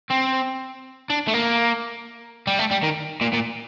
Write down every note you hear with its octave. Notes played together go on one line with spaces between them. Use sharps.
C4
D4
A3
A#3
G3
A3
G3
D#3
A#2
A#2